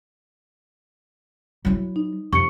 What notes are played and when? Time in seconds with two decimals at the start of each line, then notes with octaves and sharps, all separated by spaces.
1.65 F#3 E4
1.96 D#4
2.33 F2 G4 C#6 C#7